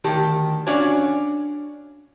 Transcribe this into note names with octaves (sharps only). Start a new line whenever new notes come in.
D2 D#3 G4 A5
C#4 D4 F#4 D5 F5 G#5